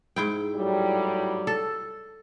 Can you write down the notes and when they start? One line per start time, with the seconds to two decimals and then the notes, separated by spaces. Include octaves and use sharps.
0.16 G#2 E4 G5
0.55 A2 F#3 G3
1.47 A4